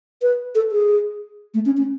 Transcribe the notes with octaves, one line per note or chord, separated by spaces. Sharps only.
B4
A4
G#4
A3
C#4
C#4